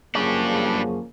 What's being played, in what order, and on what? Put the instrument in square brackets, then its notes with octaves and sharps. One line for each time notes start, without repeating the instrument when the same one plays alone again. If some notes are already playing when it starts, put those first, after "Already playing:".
[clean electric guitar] F#2 G#4 C#5 [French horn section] C#3 F3 A#3 [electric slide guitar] G3 D4